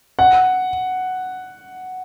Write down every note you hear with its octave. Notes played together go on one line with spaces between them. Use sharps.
F#5